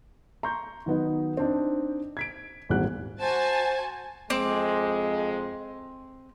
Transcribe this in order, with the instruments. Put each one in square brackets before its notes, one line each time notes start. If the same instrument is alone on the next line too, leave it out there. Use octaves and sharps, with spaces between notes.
[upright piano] A#5 C6 C#6 G6
D#3 F#3 B3 D#4
C4 D4 D#4
G#6 B6 D7
D#1 G#1 E2 G3 C4 F#6
[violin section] F#4 G#5 A5 [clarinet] C5
[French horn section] F2 G#3 [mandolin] C4 D6